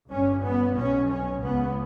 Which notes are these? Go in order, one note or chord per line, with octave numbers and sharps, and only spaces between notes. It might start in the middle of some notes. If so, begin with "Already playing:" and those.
G1 G2 C#4
B3
B1 B2 C#4
C#4
C#2 C#3 B3